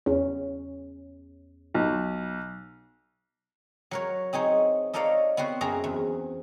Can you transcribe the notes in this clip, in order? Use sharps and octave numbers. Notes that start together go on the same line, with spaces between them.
E2 C#4
B1
F#3 A#4 C#5
C4 D#4 G#4 C#5
D#4 A4 A#4 C#5 D5 F5
B3 C4 F#4 C5
F#2 C4 G#4 A#5
E2